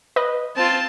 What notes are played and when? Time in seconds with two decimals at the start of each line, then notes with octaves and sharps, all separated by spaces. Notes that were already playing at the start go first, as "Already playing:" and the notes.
0.16 B4 D#5
0.56 C4 F4 A5